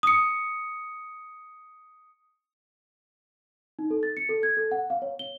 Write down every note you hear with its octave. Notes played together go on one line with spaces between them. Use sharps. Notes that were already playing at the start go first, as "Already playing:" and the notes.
D#6 C#7
D#4
A4
A6
C#7
A4
G#6
A4
F#5
F5
C#5
G7